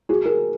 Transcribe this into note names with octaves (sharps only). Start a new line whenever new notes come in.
F#4 G#4
G#4 A#4